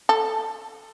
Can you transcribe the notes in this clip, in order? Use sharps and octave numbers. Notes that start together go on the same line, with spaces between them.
A4